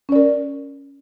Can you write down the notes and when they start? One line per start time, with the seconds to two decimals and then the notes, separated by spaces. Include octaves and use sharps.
0.09 C#4
0.12 D5
0.16 A#4